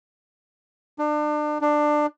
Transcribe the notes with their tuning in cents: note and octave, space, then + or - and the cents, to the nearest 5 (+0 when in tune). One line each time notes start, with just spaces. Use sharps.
D4 +35
D4 +20